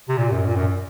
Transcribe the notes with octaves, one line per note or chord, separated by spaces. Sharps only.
C3
A#2
F#2
A#2
F#2